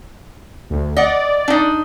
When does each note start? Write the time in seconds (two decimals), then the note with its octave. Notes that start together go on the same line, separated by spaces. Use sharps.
0.70 D2
0.96 D5 D#5 F#5
1.48 D4 D#4